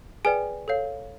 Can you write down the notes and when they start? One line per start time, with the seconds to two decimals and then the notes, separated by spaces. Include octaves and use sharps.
0.25 G#4 B4 D5 G5 G#5
0.68 A4 C#5 F5